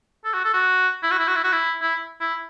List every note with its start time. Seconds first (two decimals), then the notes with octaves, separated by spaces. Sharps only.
0.24 A4
0.34 F#4
0.44 A4
0.54 F#4
1.03 E4
1.11 F#4
1.19 E4
1.28 F#4
1.36 E4
1.44 F#4
1.52 E4
1.82 E4
2.21 E4